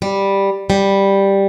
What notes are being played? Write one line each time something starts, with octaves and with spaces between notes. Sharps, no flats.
G3
G3